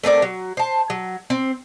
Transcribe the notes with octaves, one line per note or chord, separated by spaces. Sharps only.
A3 C4 A#4 D5
F#3
C5 A5
F#3
C4